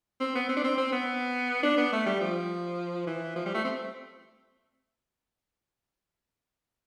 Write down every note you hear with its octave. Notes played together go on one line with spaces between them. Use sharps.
C4
B3
C4
D4
C4
C4
B3
D4
B3
A3
G3
F3
E3
F3
G3
A3
C4